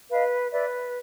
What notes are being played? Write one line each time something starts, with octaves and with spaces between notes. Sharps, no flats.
B4 D#5 F5
B4 D5 E5